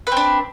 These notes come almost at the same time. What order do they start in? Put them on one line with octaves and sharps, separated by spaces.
B4 C4 D4